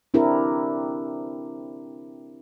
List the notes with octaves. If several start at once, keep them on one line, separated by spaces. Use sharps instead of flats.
C4 D4 E4 G4 A#4